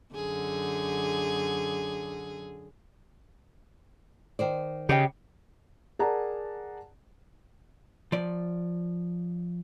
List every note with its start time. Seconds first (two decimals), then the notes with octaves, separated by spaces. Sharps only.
0.14 F#2 D3 G#4
4.39 D#3 C5 D5
4.89 C#3 G4 D#5 G5
5.99 G#4 A#4 D5 F#5 A5 A#5
8.12 F3 D5